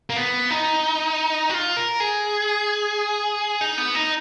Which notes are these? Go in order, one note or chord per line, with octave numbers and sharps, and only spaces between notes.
A#3
B3
D#4
F#4
F4
A#4
G#4
D#4
B3
D#4